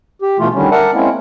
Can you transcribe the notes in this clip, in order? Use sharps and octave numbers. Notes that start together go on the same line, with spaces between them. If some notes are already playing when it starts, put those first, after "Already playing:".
G4
B2 E3 A3 F4
D3 D#3 G3 C#4
A#4 D5 E5 F#5 A5
G#3 A#3 C4 C#4 E4